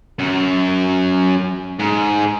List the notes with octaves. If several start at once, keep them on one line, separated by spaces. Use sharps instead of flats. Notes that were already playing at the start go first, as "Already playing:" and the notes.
F#2
G#2